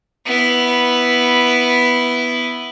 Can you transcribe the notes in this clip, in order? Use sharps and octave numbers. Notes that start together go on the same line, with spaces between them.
B3 E4